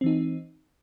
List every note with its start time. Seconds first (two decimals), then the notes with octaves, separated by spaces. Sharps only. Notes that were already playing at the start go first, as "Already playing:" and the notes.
0.01 C4
0.04 E3
0.06 D#4